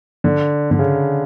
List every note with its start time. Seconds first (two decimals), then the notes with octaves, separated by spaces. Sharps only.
0.24 D3
0.71 D3
0.79 C#3